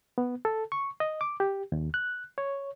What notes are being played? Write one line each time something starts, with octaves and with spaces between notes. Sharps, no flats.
B3
A4
C#6
D#5
D6
G4
D#2
F#6
C#5